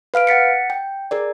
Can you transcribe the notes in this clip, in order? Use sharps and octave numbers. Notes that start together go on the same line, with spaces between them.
B4 F5 F6 D7
F#5 A6 B6 C#7
G5
G#4 A#4 D5